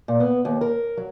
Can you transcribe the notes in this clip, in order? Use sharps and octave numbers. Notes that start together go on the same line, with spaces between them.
A#2
B3
D#2
A#4
F#3